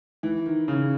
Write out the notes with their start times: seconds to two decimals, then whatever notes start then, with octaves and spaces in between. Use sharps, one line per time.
0.23 E3
0.46 D#3
0.68 C#3